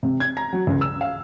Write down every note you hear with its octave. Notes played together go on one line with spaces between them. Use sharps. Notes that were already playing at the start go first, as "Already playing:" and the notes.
C3
G#6
A#5
F#3
C#2
E6
F5